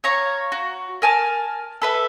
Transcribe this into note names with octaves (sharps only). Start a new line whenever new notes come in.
C#5 F5 A#5 C#6
F#4
A#4 G#5 A5 F6
A4 B4 E5